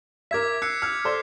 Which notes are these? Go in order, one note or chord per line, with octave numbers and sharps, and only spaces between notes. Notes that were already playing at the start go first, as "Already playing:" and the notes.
A#4 E5 D6 G#6 B6
E6 F#6 C7 C#7
F6 G#6 C#7
A4 C5 D5